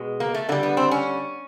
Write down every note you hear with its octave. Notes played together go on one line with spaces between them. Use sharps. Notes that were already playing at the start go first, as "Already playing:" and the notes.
Already playing: B2 G#3
A#3
A3
D3 G3 A#3
B3
C4
C#4